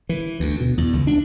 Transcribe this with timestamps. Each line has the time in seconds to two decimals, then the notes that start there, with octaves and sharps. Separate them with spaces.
0.09 E3
0.40 D2
0.60 B2
0.78 E2
0.93 C#2
1.07 D4